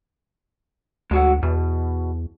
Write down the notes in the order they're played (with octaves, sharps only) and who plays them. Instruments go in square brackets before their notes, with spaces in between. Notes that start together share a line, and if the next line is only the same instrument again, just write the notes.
[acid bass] D2 [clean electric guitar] G#3 F#4 F#5
[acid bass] E2 [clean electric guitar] B2